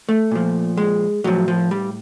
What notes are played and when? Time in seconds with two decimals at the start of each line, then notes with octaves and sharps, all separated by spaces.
0.09 A3
0.31 A#2 F3
0.77 G#3
1.24 A2 F3 F#3
1.48 F3
1.71 G3